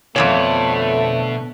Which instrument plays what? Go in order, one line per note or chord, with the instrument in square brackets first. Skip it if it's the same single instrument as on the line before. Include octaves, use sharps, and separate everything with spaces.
[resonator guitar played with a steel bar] F2 F3 C#5 [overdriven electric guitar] B2 [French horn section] D3 A3